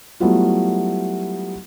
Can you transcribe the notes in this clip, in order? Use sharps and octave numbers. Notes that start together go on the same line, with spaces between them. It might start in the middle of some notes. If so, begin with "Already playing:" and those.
F#3 G3 A3 B3 E4 F4